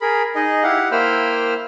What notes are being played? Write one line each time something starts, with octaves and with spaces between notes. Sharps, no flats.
G#4 A#4 B5
D#4 G#4 D#5
E4 G4 F5 F#5
A#3 E4 C5 G5 B5 F6